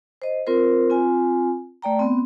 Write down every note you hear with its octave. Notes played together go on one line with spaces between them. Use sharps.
C5 D#5
C4 F4 A#4 C5
C4 F4 G#5
A3 D5 G5 A#5
B3 C4